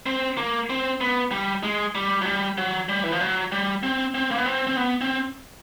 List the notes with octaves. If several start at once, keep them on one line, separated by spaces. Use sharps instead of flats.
C4
A#3
C4
B3
G3
G#3
G3
F#3
G3
F#3
G3
E3
F3
F#3
G3
C4
C4
A#3
B3
C4
C4
B3
C4